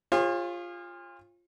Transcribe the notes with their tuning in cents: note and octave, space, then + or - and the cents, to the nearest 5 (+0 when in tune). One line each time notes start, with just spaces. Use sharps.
F4 +0 G#4 -40 C#5 -45